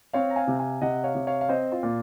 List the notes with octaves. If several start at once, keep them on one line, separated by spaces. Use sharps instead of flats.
C4 C#5 F5
A#5
F5 G#5
C3
F5 G#5
C3 D#5 F#5
C#5 F5
C3
C#5 F5
F5
C4 C5 D#5
F4
A#2